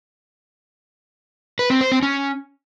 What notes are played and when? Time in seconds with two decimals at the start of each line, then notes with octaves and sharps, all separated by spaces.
1.59 B4
1.70 C4
1.81 C5
1.92 C4
2.03 C#4